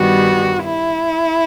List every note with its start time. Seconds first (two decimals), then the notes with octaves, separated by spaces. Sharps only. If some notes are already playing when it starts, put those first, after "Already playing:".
Already playing: G2 D#3 G3 B3 F#4
0.63 E4